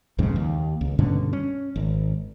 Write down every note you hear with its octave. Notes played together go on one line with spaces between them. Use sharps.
B1 F2 G#2 C#3
D#2
C#2
G2 B2 D3 C#4
C#4
G#1